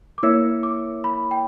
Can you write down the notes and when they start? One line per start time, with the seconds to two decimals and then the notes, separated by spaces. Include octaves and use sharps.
0.18 D6
0.23 A#3 E4 A#4 C#5 E5 E6
0.63 D6
1.04 B5
1.31 G5